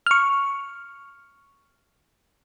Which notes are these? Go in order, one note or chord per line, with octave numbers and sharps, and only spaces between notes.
C#6 F6